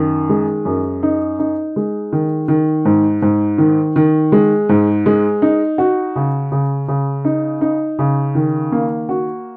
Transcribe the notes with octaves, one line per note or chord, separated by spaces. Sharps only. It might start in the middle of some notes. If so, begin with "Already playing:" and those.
Already playing: F#2 D#3
G#3
F#2
D#4
D#4
G#3
D#3
D#3
G#2
G#2
D#3
D#3
G#3
G#2
G#3
D#4
F#4
C#3
C#3
C#3
D#4
D#4
C#3
D#3
A#3
F#4